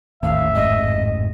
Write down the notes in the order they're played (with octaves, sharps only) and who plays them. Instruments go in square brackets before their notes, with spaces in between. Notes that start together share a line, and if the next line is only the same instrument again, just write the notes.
[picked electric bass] G#1 A2 [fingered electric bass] D#2 [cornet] E5 [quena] F5
[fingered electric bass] F1 G#2 [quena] D#5